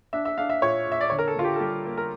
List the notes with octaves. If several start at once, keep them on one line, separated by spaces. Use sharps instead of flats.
D4 E5
E5
D4 F5
E5
A#2 C#5
A#2 E5
D5
D3 C#5
A#4
A4
D3 F4
G4
A4
G3 G4
A#3
A#4